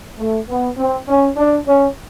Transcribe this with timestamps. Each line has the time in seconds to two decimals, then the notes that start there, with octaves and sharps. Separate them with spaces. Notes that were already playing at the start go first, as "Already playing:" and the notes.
0.18 A3
0.48 B3
0.77 C4
1.08 C#4
1.37 D4
1.66 C#4